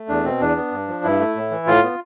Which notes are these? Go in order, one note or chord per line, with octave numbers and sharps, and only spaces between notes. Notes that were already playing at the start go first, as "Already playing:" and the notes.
Already playing: A3
E2 D4
B2 C4
E2 D4
B3
G2
F3
G2 E4
A3
A2
E3
A2 F4
B3